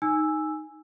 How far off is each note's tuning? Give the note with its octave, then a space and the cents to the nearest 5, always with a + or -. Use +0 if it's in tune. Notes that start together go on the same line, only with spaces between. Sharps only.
D#4 +0 G#5 +0 E6 +0